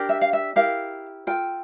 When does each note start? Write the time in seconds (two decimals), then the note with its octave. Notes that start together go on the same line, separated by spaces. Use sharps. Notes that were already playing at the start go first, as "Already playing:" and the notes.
Already playing: D4 G4 A#4
0.09 E5
0.21 F5
0.33 E5
0.56 E4 G4 A#4 F5
1.27 F4 A4 G5